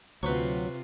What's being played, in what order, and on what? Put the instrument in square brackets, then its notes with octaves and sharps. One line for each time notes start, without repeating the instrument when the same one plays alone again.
[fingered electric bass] D2 [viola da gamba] C3 F4 [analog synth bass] F#3 [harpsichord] B4 C5 C#6